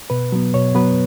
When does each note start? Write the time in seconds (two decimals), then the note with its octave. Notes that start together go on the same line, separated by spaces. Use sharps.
0.10 B2 B4
0.32 F#3 B3
0.54 B2 C#5
0.75 F#3 B3 B4